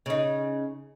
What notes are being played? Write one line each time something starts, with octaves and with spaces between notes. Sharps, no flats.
C#3 D#4